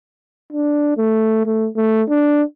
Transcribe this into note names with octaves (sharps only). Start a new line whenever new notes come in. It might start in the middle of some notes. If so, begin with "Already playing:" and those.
D4
A3
A3
A3
D4